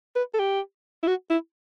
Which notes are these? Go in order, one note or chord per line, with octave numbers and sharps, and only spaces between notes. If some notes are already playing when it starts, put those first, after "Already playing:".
B4
A4
G4
E4
F#4
E4